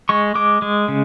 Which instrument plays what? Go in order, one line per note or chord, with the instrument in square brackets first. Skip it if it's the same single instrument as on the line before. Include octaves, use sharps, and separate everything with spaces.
[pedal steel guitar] G#3 C#6
G#3 D6
G#3
C#3